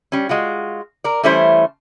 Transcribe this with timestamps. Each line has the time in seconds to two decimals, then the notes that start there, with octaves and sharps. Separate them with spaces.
0.12 G3 C#4
0.29 G#3 F4 F#4
1.04 A#4 D5
1.23 E3 G3 A3 C#4 E4 C5